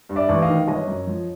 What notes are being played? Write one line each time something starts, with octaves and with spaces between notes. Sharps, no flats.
G2
D5 E5
A1
D#5 F5
D#3
G1 C#5 D#5
F#2
F3